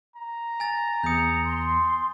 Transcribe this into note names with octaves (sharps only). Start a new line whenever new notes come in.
A#5
G#5 A6
E2 D#6 G6 C#7
C6